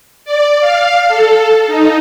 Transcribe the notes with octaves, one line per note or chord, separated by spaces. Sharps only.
D5
F5
A4
D#4